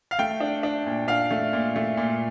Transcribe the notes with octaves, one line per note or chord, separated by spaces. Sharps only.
F5
A3 G5
D4
D4
A#2
D4 F5
A3
A#2
A3
A#2